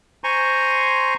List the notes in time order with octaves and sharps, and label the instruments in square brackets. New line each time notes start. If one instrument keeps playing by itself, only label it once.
[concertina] C5 G#5 A#5 C6 C#6